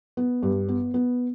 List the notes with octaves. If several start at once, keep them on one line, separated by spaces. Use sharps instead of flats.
B3
G2
B3
B3